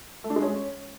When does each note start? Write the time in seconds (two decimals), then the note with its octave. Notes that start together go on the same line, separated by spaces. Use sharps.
0.24 A3
0.30 D4
0.36 G#3
0.42 C#4